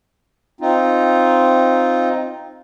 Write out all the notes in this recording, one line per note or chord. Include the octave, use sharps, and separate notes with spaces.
C4 D#4 F4